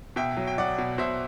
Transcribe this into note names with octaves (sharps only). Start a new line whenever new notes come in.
B2 E5 G5
F#3
G5
F#3 D5 F#5
B2
B2 C5 E5